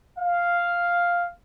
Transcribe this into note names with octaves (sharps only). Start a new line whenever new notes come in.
F5